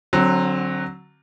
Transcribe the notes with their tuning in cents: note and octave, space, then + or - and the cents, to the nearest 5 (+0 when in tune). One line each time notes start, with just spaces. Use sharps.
D3 +0 F#3 +0 C4 +25